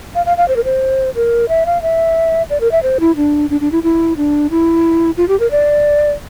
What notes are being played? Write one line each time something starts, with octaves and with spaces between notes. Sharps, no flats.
F5
F5
F5
C5
A#4
C5
A#4
E5
F5
E5
D5
A#4
E5
C5
E4
D4
D4
D4
E4
E4
D4
E4
F4
G4
A#4
D5